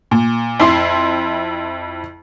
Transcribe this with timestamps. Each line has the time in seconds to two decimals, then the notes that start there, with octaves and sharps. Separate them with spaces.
0.11 A#2
0.60 F2 E4 C6 C7